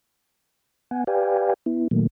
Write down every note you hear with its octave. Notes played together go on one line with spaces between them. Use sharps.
B3 F#5 G#5
G4 B4 D5 F5 G5 G#5
B3 E4
A#2 D#3 F#3 A3 A#3